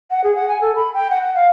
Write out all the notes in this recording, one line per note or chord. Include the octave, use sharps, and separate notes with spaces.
F#5
G#4
F#5
G#5
A4
B5
G5
F#5
F#5
F5